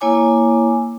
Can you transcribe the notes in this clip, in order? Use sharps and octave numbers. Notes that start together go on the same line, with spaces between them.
A#3 E4 C#5 G#5 D6